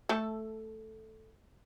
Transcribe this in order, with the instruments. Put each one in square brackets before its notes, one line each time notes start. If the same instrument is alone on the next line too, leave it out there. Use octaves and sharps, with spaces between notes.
[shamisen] A3 A4